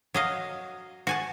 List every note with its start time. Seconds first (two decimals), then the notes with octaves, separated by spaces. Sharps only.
0.14 F#3 D#5 F5
1.07 F#4 G#5 A5